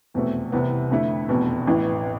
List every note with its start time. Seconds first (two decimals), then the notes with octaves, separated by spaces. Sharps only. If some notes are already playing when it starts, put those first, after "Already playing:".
0.14 F1 E2 B2 A3 C4
0.52 C2 C3 E3 B3
0.91 F2 D3 A3 E4
1.29 F1 E2 B2
1.67 A1 A2 E3 B3